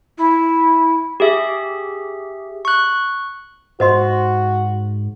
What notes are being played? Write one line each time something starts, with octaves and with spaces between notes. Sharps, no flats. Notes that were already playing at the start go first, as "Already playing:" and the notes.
E4
G4 G#4 E5
C#6 F#6
G#2 F#4 C5 D#5 C6